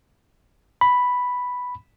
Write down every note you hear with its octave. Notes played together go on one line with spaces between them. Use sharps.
B5